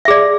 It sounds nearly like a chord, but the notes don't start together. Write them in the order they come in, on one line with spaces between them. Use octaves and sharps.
E5 G#4 D5